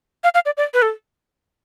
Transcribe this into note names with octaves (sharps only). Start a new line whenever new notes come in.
F5
F5
D5
D5
B4
A4